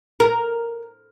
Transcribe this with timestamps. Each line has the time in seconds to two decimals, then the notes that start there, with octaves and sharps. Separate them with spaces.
0.20 A#4